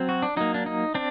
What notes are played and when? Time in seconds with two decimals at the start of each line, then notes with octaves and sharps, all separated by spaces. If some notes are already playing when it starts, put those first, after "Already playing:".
Already playing: F#3 C4
0.09 F#4
0.23 D4
0.37 F#3 A#3 D#4
0.54 D4
0.66 D#4
0.94 C4 D4